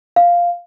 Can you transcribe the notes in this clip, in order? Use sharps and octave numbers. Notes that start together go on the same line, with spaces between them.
F5